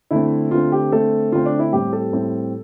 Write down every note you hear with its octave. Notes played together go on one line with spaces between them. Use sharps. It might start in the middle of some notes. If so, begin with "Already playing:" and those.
D3 A3 C4 E4
D3 A3 C4 F4
G4
D3 A3 C4 A4
D3 A3 C4 F4
D4
E4
A2 G3 C4 G4
A4
A2 G3 C4